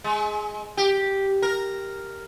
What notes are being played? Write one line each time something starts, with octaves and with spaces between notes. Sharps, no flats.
G#3
G4
A#4